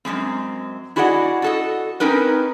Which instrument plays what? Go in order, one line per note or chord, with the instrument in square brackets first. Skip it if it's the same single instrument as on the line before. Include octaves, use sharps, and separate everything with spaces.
[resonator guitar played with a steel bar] F#2 C#3 G#3 C4
E4 F#4 G#4 D5 D#5 F#5
F#4 A4 D#5
C4 C#4 D#4 A#4 B4